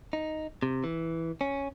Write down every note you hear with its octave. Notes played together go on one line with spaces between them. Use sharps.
D#4
C3
E3
C#4